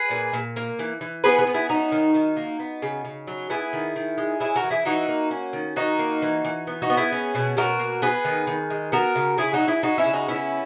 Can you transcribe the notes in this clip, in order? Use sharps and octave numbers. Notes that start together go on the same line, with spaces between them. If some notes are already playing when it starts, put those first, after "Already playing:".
Already playing: G#4 B4
A#2
A#2
A#3
E3
E3
B3 G#4 B4
G#4 B4
B3
E4 G#4
C#4 D#4 F#4
D#3
D#3
A#3
B3
C#3
C#3
F#3
B3 E4 G#4
D#3
D#3
G#3
C#4 E4 G#4
F#4 A#4
E3
E4 G#4
E3 D#4 F#4
A#3
C#4
D#3
D#3 D#4 F#4
A#3
E3
E3
B3
D#4 F#4
B3
E4 G#4
C#4
B2
B2 F#4 A#4
A#3
B3 G#4 B4
D#3
D#3
G#3
B3 F#4 A#4
C#3
C#3 E4 G#4
D#4 F#4
F#3
E4 G#4
G#3 D#4 F#4
C#4 E4
C#3
D#4 F#4
B3 C#4 E4